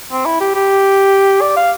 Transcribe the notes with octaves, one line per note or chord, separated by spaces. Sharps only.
C4
E4
G4
G4
D5
F5